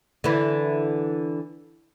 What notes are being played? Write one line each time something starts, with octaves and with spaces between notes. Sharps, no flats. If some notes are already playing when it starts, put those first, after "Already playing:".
D3 E3